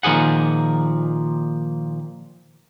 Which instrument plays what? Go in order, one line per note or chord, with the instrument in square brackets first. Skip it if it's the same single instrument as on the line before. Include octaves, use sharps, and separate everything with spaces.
[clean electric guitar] A#2 D#3 F3 G#4 F#5